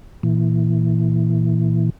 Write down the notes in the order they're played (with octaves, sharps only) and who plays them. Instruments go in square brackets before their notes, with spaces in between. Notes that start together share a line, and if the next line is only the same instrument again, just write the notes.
[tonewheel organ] A#2 E3